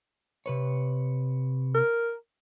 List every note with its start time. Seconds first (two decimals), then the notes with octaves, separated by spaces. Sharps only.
0.46 C3 B4 C#5
1.75 A#4